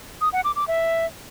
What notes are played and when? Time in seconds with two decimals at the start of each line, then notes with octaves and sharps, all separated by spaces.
0.21 D#6
0.33 F#5
0.44 D6
0.56 D6
0.68 E5